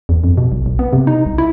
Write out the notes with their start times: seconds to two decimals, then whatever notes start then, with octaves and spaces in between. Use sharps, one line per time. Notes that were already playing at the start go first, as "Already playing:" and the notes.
0.09 E2
0.24 F2
0.38 B2
0.52 B1
0.66 B1
0.79 B3
0.93 C3
1.07 D#4
1.26 C2
1.38 E4